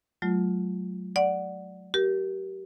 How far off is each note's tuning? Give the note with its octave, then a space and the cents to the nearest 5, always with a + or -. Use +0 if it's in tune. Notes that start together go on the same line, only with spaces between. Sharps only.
F#3 +0 A3 -30 F4 +5
D5 +0 F#5 +0
G4 -25 A#4 +15